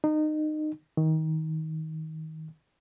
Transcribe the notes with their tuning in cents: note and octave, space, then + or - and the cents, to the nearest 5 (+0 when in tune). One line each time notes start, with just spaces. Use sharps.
D#4 -25
D#3 +25